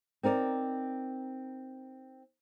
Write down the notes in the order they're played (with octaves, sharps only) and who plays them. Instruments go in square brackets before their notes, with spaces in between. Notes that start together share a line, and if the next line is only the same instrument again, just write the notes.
[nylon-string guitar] C4 D#4 A#4 D5